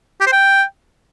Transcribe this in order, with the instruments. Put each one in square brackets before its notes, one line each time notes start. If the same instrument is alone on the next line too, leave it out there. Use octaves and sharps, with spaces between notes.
[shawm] G4
C5
G5